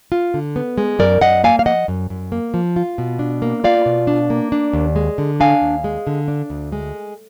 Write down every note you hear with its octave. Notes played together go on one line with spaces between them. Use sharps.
F4
D3
B3
G#3
F#2 A#4 D5
F#2 D#5 F#5
A#3 F5 G#5
F5
F3 D#5 F#5
F#2
F#2
A#3
F3
F4
B2
D4
A#3
F4 D5 F5
B2
D4
A#3
D4
D#2
G#3
D3
D4 F5 G#5
D#2
G#3
D3
D4
D2
G#3